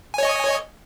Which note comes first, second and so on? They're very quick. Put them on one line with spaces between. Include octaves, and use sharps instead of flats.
G#5 C#5 D#5